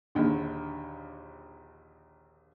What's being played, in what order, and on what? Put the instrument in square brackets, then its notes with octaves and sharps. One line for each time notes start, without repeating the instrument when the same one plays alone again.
[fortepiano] A#1 D#2 D3